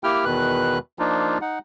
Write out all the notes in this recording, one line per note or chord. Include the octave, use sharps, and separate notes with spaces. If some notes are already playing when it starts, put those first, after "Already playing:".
A#3 E4 G4 G5 F6
E2 B2 D#3 B4 F#6
F3 A#3 D4 D#4 F4
D#4 F#5